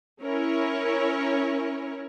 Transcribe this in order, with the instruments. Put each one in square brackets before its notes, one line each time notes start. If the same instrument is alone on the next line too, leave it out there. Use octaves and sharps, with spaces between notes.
[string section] C#4 E4 A#4 C#5